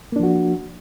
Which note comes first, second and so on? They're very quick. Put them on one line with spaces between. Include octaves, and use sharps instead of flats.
A#3 D4 F3 F#4